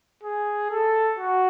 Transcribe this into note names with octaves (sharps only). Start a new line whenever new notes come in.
G#4
A4
F#4